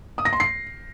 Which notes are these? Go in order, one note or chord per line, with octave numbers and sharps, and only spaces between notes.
D#6
A#6
C6
C7